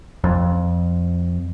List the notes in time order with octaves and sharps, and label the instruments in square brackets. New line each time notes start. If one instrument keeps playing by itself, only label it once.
[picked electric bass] F2